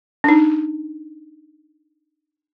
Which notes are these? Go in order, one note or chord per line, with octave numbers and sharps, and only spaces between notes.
D4 D#4